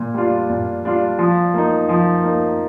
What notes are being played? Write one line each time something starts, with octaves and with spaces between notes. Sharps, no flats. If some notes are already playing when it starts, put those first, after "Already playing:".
Already playing: A#2
G3 D4 F4
A#2
G3 D4 F4
F3
A#3 D#4
F3
A#3 D#4